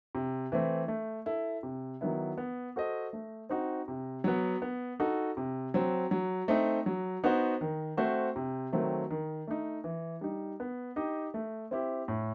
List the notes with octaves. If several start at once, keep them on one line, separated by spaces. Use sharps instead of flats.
C3
E3 A3 C4
A3
E4 A4
C3
D#3 F#3 B3 E4
B3
F#4 A4 C5 D#5
A3
C4 D#4 F#4
C3
F#3 B3
B3
D#4 F#4 A4
C3
F#3 C4
F#3
A3 C4 D#4
F#3
B3 D#4 F#4 C5
D#3
A3 C4 F#4 C5
C3
D#3 F#3 A3 C4
D#3
A3 D#4
E3
G3 D#4
B3
D#4 G4 D#5
A3
C4 E4 G4
A2